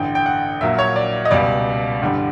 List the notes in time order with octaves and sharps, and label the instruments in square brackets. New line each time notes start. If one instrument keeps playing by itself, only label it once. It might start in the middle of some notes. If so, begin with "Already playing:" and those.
Already playing: [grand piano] A1 G2 D3 G5
G5
F#5
A#1 A#2 F#3 E5
C#5
D5
D#5
C#2 B2 G3 D5
A1 G2 D3 G3